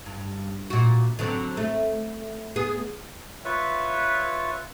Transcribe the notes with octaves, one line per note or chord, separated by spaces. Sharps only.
G2
A#2 F#4
D3 F#3 C4
A3
B3 G#4
F4 B4 C#5 E5